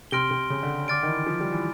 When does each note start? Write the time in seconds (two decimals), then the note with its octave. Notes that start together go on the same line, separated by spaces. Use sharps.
0.11 C3 C6 F6 A#6 D7 G7
0.31 C3
0.50 C#3
0.63 D3
0.88 D3 D6 F6 A6 D7
1.03 D#3
1.08 E3
1.26 F3
1.40 G3
1.52 E3